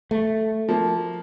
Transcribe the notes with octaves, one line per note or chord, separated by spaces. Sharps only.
A3
F3 A#3